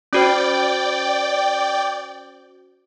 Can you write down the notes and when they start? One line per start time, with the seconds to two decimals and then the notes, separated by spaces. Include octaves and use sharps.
0.13 C#4 F#4 C5 D5 G5